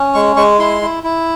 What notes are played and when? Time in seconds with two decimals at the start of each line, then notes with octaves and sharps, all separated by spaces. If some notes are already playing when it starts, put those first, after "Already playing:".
Already playing: C#4
0.14 G#3 C#6
0.36 G#3 C#6
0.59 E4 C6
0.82 E4
1.03 E4